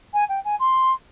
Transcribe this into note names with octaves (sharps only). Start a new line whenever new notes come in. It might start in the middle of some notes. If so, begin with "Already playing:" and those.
G#5
G5
G#5
C6